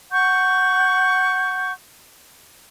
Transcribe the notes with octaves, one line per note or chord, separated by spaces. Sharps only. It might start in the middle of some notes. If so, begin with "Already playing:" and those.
F#5 C#6 G6